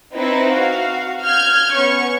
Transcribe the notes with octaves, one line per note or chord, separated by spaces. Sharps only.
C4 D#4 E4 B4
F#4 F5
F6 G6 G#6
B3 C#4 C#6